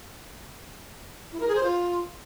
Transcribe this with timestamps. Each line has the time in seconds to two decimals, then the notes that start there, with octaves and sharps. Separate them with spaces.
1.33 E4
1.40 A#4
1.48 G#4
1.55 C5
1.63 F4